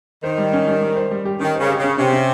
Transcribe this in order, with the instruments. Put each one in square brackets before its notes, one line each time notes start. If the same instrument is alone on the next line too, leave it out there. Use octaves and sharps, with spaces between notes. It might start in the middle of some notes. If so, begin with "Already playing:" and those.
[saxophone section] D#3 [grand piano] C5
[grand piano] G3
C#4
G3
G3
C5
G3
G4
[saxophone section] D#3 [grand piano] C#4
[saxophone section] C#3 [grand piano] C5
[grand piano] G4
[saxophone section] C#3 [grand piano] C#4
[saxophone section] C3 [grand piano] C#4
[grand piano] C#4